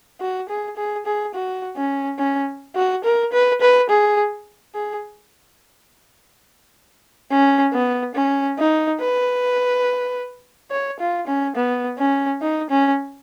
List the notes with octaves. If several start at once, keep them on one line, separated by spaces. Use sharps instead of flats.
F#4
G#4
G#4
G#4
F#4
C#4
C#4
F#4
A#4
B4
B4
G#4
G#4
C#4
B3
C#4
D#4
B4
C#5
F4
C#4
B3
C#4
D#4
C#4